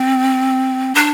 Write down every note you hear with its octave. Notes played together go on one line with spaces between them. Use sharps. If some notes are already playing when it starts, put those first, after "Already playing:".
Already playing: C4
D4